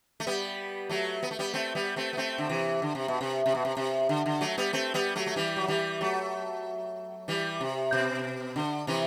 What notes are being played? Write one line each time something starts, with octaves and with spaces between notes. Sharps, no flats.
A3
G3 B3
F#3 A3
B3
A3
G3 B3
A3 C4
G3 B3
A3 C4
B3
A3 C4
D3
C3 E3
D3
C3
B2
C3
C3
B2
C3
C3
D3
D3
F#3 A3
G3 B3
A3 C4
G3 B3
F#3 A3
A3
E3 G3
F#3
E3 G3
F#3 A3
E3 G3
C3
B2
D3
C3 E3